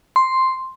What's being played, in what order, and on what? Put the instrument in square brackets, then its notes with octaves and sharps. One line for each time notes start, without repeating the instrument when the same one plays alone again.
[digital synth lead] C6